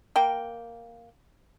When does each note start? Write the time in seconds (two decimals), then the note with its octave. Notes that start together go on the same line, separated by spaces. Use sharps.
0.16 A#3 G5